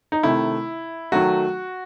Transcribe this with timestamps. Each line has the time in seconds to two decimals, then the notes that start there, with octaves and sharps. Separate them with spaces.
0.12 D#4
0.23 C3 D#3 A3 E4
1.12 D#3 F#3 A3 F#4